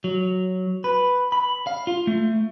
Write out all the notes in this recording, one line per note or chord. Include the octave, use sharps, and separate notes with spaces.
F#3
B4
B5
F5
F4
A3